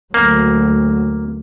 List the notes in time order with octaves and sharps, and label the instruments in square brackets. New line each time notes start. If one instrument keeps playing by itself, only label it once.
[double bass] D2 F#3 [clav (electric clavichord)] A#3